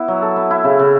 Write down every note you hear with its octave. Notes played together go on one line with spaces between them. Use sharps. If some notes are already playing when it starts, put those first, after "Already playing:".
Already playing: B3 E4
F#3
A4
B3
E4
C#3
C#3